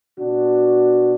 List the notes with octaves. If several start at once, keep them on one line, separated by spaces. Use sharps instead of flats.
B2 D4 F#4